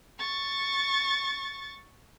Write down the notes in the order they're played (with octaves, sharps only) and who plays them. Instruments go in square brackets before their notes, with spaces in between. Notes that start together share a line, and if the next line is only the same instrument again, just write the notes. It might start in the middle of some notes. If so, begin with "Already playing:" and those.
[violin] C#6 A6